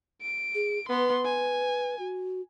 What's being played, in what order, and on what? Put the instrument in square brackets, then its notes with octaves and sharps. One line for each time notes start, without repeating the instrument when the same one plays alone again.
[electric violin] D7
[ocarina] G#4
[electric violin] B3 C6 [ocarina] B4
[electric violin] G#5
[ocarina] F#4